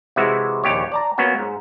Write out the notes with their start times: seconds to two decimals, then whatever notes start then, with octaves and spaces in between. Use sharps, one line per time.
0.16 C3 E3 G#3 E4 F#4
0.64 A#1 D#2 G4 C#5
0.92 D5 A5 A#5
1.18 F#3 A#3 B3 C#4 F#4
1.38 G#2